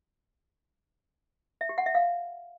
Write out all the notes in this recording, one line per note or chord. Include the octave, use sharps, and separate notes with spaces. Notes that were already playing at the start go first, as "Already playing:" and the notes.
E5
G4
F#5
E5
F5